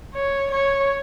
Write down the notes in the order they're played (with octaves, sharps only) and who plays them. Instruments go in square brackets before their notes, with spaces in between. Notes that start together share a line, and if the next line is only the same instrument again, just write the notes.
[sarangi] C#5
C#5